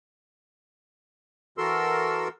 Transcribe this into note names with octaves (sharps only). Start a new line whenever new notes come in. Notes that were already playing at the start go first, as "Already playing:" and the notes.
E3 F#4 A4 A#4 C6 E6